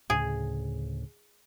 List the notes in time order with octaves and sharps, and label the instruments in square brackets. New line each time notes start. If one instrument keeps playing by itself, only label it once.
[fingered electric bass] D2 A2 C#3 [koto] G#4